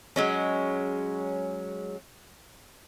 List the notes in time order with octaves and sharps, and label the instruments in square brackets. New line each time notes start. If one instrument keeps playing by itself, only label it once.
[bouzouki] F#3 G#3 C#4